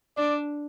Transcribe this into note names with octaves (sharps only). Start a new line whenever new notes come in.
D4 D5